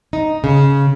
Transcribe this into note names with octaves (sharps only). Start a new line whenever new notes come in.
D#4
C#3